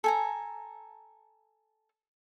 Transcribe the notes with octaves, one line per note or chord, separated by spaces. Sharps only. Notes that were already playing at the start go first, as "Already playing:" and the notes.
A4 G#5 A#5